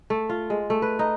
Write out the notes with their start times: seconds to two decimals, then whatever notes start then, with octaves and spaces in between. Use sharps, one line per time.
0.10 A3
0.30 F4
0.50 G#3
0.70 A3
0.82 B4
0.99 D#4